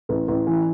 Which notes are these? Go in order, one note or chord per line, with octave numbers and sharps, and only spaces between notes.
A1
A1
E3